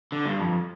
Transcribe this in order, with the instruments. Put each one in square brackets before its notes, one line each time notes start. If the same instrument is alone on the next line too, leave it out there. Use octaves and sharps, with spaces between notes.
[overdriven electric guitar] D3
G2
F2